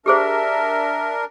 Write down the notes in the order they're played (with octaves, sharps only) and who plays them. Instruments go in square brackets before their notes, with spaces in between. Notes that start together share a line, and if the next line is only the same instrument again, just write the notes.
[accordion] D4 A#4 [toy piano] G4 G#4 C5 [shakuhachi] E5